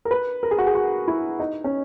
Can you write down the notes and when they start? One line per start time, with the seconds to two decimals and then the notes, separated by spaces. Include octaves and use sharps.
0.05 A#4
0.11 B4
0.43 A#4
0.51 G#4
0.58 F#4
0.67 G#4
0.75 F#4
1.08 E4
1.40 D#4
1.64 C#4